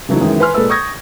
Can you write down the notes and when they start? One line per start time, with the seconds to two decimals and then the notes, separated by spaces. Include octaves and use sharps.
0.09 C#3 E3 F#3 A3 D#4
0.21 F#2 D#3 E3 G#3 D#4
0.40 B4 G#5 C6 F6
0.54 A#2 G#3 A4 B4 E6
0.69 C#6 D#6 G6 G#6 A#6